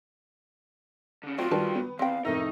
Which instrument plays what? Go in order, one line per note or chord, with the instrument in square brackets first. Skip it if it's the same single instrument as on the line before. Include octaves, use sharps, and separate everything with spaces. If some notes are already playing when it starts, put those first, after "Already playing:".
[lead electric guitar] D3 C#4
[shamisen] F#3 A3 C4 [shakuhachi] F4 [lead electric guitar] F#4 D5
[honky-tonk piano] D#3 G3 [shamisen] G4 B4 A5
[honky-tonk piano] B3
[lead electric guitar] E2 [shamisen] C4 G5 [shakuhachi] F5
[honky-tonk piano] F1 A2 E5 [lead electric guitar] D#4 [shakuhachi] A#4